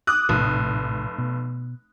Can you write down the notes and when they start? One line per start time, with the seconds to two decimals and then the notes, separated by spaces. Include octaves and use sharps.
0.07 D6 D#6 F#6
0.29 F1 A#1 A2 C3
1.18 B2